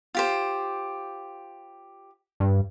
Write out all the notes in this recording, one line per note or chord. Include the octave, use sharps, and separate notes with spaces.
F4 G4 C5
G2